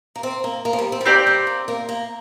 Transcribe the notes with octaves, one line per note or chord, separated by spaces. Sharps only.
A#3
C4
A#3
A#3
F3
G3
C4
G3
A#3 C4 G4 D5
G3
A#3
A#3
A#3